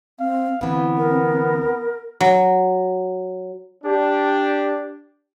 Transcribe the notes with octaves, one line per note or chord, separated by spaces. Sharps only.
C4 F5
D2 E3 B3 C4
A#4
F#3
D4 G4